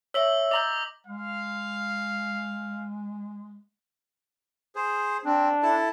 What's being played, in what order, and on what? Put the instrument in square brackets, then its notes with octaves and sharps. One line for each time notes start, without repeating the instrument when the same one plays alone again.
[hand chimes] C#5 E5 [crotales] E6 B6 F#7
[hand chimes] D#5 A#5 G6 [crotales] D6 A#6 F#7
[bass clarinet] G#3 [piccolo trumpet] F5
[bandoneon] G#4 C5
[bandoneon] C4 [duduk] D4
[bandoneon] E4 A4 A5